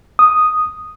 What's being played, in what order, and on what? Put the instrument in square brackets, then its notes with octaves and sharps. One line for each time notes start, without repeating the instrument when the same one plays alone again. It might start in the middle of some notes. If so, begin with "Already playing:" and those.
[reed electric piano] D#6